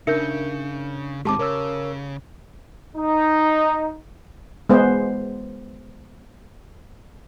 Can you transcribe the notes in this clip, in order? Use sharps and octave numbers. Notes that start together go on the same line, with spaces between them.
C#3 D4 D#4 A#4 E5 G6 C#7
A2 D#3 G#3 C4 G4 A5 D6
C#3 A#4 C#5 E6
D#4
G#3 B3 C5